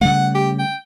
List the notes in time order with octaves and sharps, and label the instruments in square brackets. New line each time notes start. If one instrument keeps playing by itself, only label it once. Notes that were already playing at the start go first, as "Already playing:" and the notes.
[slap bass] C#3 G3 A3 [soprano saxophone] F#5
[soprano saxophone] G4
G5